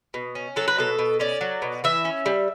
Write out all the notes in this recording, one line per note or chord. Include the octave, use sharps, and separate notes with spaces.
B2
C#4
F#3 A4
B4
B2 A4
B2
C#4 D5
F#3
B2
E3 E5
C#4
G3